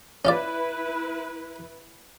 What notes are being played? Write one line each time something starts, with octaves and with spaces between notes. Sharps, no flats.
C#4 E4 F4 B4 D5